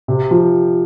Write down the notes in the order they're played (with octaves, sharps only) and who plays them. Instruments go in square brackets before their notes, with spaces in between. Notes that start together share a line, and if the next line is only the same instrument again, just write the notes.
[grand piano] C3
F3